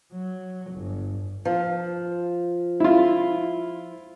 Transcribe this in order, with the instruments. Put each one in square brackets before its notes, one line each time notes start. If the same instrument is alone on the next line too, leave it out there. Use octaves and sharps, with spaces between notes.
[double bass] F#3
G1
[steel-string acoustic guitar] F3
[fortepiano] E4 F4